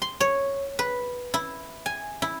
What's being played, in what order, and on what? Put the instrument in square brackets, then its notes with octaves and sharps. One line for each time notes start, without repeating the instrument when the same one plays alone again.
[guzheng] C6
C#5
B4
E4
G#5
E4